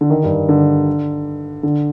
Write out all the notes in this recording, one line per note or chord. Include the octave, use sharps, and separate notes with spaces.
D3
D#3
G2
D3
D3